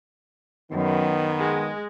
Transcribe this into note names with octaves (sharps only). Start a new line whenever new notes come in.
F#2 D#3 B3
G#3